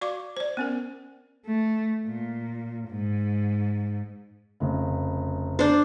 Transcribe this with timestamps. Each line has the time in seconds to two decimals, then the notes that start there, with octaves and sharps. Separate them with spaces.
0.01 F#4 D5 F5 C#6 D6
0.37 C5 D5
0.57 B3 C#4 A#4
1.46 A3
2.06 A#2
2.90 G#2
4.60 F1 C#3
5.59 D4 C5